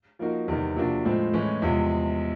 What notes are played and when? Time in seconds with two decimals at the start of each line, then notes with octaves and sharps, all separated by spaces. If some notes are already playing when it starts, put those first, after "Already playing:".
0.19 F3 A#3 D#4 F#4 A#4
0.48 E2 C3 D#3 G3 B3
0.76 C3 F3 A#3 D4 F#4
1.05 A2 F3 G#3 C4
1.33 A2 E3 G#3 C#4
1.62 E2 C3 F3 G#3